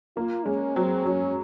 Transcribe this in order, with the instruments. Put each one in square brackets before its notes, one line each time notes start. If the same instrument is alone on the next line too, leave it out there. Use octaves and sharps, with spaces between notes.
[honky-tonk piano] A#3 [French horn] F4
[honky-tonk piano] G#3 [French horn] C#4
[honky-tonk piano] F#3 [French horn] C4
[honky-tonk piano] F#3 [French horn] C#4